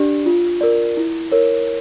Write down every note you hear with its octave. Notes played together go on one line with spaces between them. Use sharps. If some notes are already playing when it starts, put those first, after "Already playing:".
Already playing: D4 G4 D5
F4
A#4 D5
E4
A#4 C#5